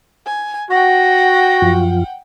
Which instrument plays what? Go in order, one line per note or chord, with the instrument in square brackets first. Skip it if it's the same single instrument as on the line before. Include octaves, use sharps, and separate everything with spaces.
[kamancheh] G#5
[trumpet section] F#4 [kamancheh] F#5 G5 [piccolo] A#6
[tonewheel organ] F#2 F3 F4